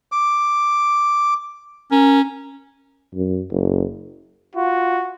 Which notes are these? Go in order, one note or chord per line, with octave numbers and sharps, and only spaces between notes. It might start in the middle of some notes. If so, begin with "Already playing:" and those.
D6
C#4 A#4
F#2
F#1
F4 F#4